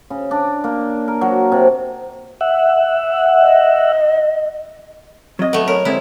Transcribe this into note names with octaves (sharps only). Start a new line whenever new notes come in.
C#3
D4
A#3
A#4
F#3
C3
E5 F#5
D#5
F#3 C4 D#5
A3 B3
A#4 C#5
D3 G#3 C4 E4